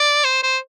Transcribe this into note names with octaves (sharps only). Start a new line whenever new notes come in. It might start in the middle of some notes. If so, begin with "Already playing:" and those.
Already playing: D5
C5
C5